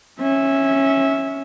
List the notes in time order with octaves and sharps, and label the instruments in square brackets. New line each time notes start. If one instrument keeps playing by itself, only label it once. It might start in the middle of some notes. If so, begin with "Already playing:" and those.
[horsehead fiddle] C#4 E5